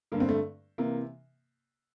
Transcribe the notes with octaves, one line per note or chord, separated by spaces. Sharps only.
G2 D3 A#3
C4
A3
C3 E3 A#3